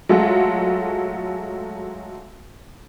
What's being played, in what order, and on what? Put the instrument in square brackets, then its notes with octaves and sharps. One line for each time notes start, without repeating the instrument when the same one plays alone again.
[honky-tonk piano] F#3 G#3 A3 F4